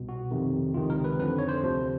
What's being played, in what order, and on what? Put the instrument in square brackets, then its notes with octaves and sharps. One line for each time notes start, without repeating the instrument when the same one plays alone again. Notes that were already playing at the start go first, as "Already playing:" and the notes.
Already playing: [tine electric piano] C2 B2
F#4
F2 C3 D#3
C#2 C3 D#3 F4
A#4
B4
F2 D3 F3 B4
C#5
C5
D2 C3 F3